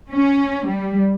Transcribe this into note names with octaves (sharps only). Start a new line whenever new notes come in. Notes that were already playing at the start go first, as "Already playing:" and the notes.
C#4
G3